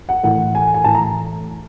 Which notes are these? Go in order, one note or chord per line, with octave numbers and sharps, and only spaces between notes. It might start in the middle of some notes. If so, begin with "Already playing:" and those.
F#5
A2 E3 F#5
G#5
G#5
A2 E3 A5
A#5